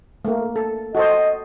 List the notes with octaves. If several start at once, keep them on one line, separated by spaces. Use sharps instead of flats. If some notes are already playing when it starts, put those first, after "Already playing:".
A3 A#3
A4
F#4 A4 C5 D#5